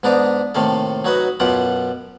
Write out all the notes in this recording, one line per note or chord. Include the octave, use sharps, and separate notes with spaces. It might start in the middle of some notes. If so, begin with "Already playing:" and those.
G#2 B3 D4 D#4 A#5 D#6
A2 C3 D#3 A#3 A4
F#3 D#4 F#4 B4 D#5
F#2 B2 F4 G4 F#5